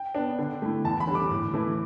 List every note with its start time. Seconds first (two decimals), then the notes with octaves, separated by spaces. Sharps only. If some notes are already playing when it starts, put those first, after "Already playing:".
Already playing: G5
0.15 B3 D4
0.38 D3
0.62 A3 E4
0.85 E2 A5
1.00 B5
1.07 D3 G3
1.15 D6
1.31 A2
1.54 E3 A3 E4